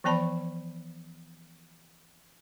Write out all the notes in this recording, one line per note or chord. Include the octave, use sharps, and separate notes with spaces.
E3 F3 B3 D5 A5 B5